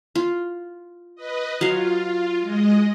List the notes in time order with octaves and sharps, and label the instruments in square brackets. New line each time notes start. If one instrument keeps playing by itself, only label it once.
[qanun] F4
[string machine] B4 D#5
[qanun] F#3 F5 [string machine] F4
[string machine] G#3 D#5